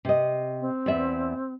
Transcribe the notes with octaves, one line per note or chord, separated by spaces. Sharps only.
C3 D#5
C4
E2 D5 E5